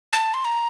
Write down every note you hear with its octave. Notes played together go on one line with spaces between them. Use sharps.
A5
C6
A#5